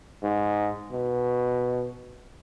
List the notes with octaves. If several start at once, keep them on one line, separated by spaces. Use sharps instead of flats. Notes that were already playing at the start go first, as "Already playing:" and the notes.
G#2
B2